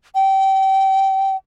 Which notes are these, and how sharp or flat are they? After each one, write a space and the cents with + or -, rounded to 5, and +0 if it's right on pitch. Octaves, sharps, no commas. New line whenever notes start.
G5 -25